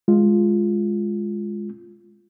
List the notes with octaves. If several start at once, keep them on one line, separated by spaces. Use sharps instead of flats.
G#3 F4